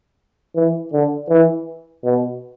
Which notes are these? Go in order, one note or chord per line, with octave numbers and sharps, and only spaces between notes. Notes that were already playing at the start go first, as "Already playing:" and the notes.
E3
D3
E3
B2